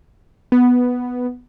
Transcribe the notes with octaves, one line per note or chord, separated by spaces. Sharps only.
B3